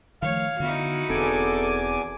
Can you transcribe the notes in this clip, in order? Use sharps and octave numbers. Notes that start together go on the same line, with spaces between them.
D#3 F3 A3 C#5 F5
D3 B3 D#4 E4 F#4
E1 E2 C4 A4 G#5 D6